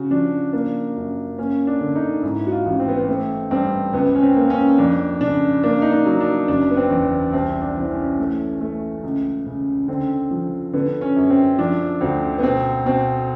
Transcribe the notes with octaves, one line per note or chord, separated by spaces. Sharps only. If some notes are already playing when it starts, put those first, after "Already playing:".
Already playing: C#3 F#4
F3 D4
A#3 D4
F#2
A#3 C#4
D4
D3
D#4
G#2 E4
F#4
F4
A1
C4
B3
C4
A3 C4
G2 C4
C#2 B3
C#4
C4
A#3
C#4
F2 D4
C#3 D4
A#3 D4
D#4
D4
F#3
D4
F#1 D4
B3
C4
E2
C2 C4
D4
E3 C4
C#4
A3
A3
C#2
C#3
D3 C4
F3
D3 B3
C#4
F#2
C4
F3 D4
D2 C4
B3
B2 C4
B2 C4